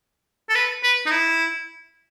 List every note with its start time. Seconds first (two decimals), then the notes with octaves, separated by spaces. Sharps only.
0.49 A4
0.55 B4
0.84 B4
1.06 D#4
1.11 E4